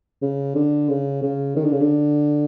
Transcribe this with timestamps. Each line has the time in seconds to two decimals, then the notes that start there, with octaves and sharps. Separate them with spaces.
0.22 C#3
0.55 D3
0.89 C#3
1.22 C#3
1.56 D#3
1.64 D3
1.72 C#3
1.81 D3